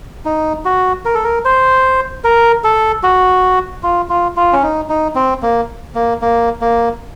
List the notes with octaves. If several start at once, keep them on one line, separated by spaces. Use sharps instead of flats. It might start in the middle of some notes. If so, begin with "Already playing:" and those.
D#4
F#4
A#4
A4
A#4
C5
A#4
A4
F#4
F4
F4
F4
C#4
D#4
D#4
C4
A#3
A#3
A#3
A#3